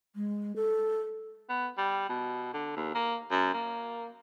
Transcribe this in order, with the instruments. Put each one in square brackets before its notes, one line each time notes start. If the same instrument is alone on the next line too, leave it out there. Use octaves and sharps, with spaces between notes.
[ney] G#3
A4
[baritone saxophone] B3
G3
B2
D3
D#2
A#3
F#2
A#3